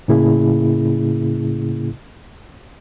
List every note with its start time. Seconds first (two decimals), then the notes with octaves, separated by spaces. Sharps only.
0.08 A2 C#3 A#3 C#4 E4 G#4